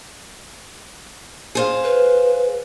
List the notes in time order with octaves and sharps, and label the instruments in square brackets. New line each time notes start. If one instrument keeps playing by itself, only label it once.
[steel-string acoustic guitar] G#4 C5 F5
[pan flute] B4